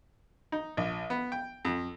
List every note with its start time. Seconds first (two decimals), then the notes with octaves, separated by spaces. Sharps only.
0.52 D#4
0.77 A#1
1.10 B3
1.32 G5
1.65 F2